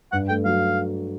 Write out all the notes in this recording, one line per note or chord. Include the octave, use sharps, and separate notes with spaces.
G2 F#5
A3 G5
F#3 F5